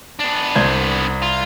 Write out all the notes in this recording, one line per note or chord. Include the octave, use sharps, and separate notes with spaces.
B3 D4
C2 C5 G#6
F4